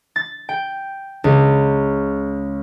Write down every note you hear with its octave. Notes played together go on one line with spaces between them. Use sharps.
A6
G5
C#2